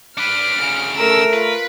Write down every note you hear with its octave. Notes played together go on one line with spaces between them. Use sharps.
D4 B4 F6 D7
D2 C#3
A3 A4 A#4 E6
F4 B4